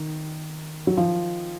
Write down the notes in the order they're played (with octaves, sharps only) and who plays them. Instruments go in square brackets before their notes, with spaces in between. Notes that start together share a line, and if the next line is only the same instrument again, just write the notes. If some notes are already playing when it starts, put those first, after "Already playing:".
Already playing: [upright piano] D#3
[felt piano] F#3
F3